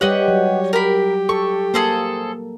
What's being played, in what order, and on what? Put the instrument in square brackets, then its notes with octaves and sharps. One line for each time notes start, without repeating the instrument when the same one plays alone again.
[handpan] G3 G4 [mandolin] B4 D#5 F#5 [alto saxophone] C#5
[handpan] F#3
[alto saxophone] G4 [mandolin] A#4 B5
[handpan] A4 [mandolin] C#6
[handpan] A#3 [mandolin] G#4 A4 C5